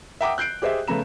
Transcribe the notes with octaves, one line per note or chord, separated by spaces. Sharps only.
E5 F#5 G5 A#5 D6 D#6
F#6 G6 C7 D7
G4 G#4 C5 D#5 E5
C#3 A3 B3 A#5 E7